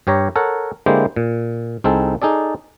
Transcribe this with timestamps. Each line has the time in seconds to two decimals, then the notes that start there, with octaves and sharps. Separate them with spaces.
0.07 G2 G4 C#5 A#5
0.36 A4 A#4 C#5 F#5 A#5
0.86 D3 G#3 A#3 E4 G4 C5
1.16 A#2
1.84 C2 C4 D#4 G#4 A4
2.22 D#4 G#4 A4 D5